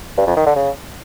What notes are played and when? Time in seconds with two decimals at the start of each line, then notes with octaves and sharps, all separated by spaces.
0.17 G2
0.27 F2
0.36 D#3
0.46 D3
0.56 C#3